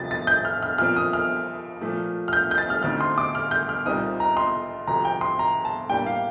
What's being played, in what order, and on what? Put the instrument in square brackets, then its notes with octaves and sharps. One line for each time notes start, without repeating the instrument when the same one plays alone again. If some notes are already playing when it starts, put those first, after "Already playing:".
Already playing: [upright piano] D2 C3 F3 A6
A6
G6
F6
F6
A#2 F3 C4 F6
D#6
F6
A#2 F3 A3
F6
G6
G6
A6
F6
D2 D3 A3 C4 D#4 F6
C6
D6
F6
G6
F6
C2 A#2 G3 C4 D#4 D#6
A#5
C6
D2 C3 F3 A#5
G5
C6
A#5
A5
A2 G3 A#3 D4 G5
F5